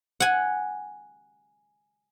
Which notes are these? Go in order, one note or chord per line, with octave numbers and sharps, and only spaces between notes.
F#5 G#5